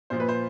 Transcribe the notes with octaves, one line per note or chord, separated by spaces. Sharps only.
A#2 F3 C5
B4
C5